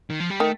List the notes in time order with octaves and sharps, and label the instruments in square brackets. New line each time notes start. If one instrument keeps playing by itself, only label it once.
[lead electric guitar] D#3
F3
G3
[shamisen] D#3 [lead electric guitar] A3